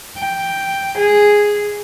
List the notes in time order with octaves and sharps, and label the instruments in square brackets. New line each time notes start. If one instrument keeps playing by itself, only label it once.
[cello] G5
G#4